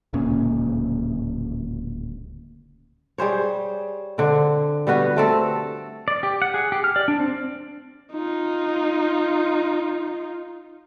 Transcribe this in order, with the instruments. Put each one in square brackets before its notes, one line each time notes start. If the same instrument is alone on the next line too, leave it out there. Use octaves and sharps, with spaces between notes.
[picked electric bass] D1 C#2 A#2 C#4
[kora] G3 G#4 C5 C#5
D3 C4
G3 B3 F#4 B4
A3 C4 A4
[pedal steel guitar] D5
G4
F#5
G#4
G4
F6
D5
D4
C4
[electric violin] D#4 F4